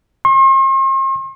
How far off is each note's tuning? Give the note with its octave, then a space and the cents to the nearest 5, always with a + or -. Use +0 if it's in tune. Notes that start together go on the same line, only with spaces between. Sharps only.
C6 +45